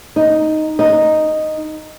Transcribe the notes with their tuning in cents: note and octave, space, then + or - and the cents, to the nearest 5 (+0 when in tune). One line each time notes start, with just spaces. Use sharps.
D#4 +0
D#4 -5